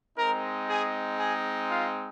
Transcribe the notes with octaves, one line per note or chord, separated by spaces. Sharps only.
G#3 C4 D#4 A#4 A#5
G#4 G#5
G#4 G#5
F4 F5